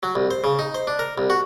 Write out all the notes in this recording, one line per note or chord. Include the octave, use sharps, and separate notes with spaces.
F#3
C2
C5
C#3
D#4
C5
D4
A#4
C2
F#4